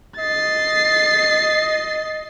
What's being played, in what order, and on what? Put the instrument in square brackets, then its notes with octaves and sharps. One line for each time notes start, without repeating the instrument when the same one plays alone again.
[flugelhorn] D#5 [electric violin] A6 C7